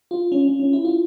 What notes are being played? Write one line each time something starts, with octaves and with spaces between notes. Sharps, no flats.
F4
C#4
C#4
C#4
E4
F4